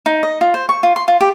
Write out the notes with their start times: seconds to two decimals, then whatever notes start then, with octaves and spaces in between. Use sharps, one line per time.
0.06 D#4
0.23 D#5
0.41 F4
0.54 C5
0.69 C#6
0.83 F4
0.96 C6
1.08 F4
1.21 G4